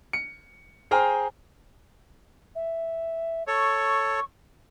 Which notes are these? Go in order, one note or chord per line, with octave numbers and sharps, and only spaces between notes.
C#7
G#4 C5 G5 G#5 A#5 F6
E5
A4 C#5 C#6